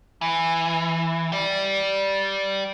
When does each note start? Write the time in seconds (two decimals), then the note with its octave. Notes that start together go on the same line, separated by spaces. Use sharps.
0.21 E3
1.32 G4 D5